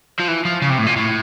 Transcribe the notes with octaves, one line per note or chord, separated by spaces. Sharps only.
F3
E3
F3
C#3
C3
A2
A#2
A2